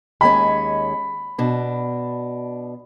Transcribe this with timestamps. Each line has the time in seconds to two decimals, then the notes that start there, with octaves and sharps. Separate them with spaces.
0.21 D#2 G#3 C#4 B5
1.38 B2 D4